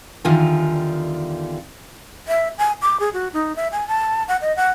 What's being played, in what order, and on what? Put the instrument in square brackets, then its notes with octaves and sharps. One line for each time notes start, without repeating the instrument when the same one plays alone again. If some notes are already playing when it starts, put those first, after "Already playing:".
[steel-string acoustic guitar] E2 D3 D#3 G3 F4 G#5
[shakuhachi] E5
G#5
D6
G#4
F#4
D#4
E5
G#5
A5
F#5
D#5
F#5